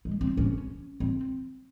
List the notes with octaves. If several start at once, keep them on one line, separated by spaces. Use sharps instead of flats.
G#3
C4
C#4
C4